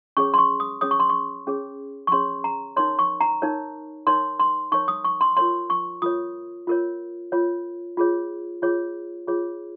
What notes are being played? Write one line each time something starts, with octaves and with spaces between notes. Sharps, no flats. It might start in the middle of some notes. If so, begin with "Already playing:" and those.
C#4 G#4 C#5 C#6
C6
C#6
D#6
C#4 G#4 C#5 D#6
C#6
C6
C#6
C#4 G#4 C#5
C#6
C#4 G#4 C#5 C6
A#5
D#4 A#4 C#5 C6
C#6
A#5
D#4 A#4 C#5
D#4 A#4 C#5 C6
C6
D#4 A#4 C#5 C#6
D#6
C#6
C6
F4 A#4 C#5 C6
C#6
F4 A#4 C#5 D#6
F4 A#4 C#5
F4 A#4 C#5
F4 G#4 C#5
F4 G#4 C#5
F4 G#4 C#5